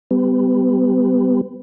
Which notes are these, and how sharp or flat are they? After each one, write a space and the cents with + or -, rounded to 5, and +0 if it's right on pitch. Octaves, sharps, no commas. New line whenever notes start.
G3 +0 B3 +30